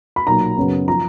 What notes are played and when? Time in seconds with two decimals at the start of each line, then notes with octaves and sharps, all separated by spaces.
0.16 B5
0.27 B1 A#2 F#3 A#3 A#5
0.57 F#2 C#3 F#3 B3
0.88 F3 A#5